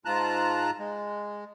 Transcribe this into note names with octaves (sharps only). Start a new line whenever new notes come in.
G#2 F4 A5 A#5 F#6
G#3